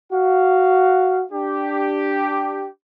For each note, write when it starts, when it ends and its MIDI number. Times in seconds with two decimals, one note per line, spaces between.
0.12 1.23 66
0.12 1.23 77
1.32 2.68 62
1.32 2.68 67